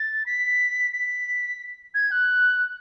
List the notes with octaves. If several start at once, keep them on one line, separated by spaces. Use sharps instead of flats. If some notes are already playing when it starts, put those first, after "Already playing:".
Already playing: A6
B6
B6
G#6
F#6